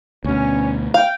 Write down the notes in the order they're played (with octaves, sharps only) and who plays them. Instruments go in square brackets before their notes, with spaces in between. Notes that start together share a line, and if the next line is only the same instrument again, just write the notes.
[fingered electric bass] D2 B2 [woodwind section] C#4
[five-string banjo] F5 [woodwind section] G5